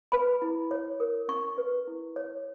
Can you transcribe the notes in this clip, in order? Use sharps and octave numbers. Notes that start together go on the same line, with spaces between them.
B4 B5
E4
C#5
A#4
C#4 C#6
B4
E4
C#5